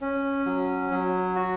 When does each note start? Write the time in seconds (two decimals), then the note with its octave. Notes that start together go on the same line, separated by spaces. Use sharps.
0.01 C#4
0.46 F#3
0.91 F#3
1.36 F#4